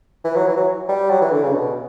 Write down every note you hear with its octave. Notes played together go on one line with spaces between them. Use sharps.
E3
F#3
E3
F#3
G3
F#3
E3
D3
C#3
B2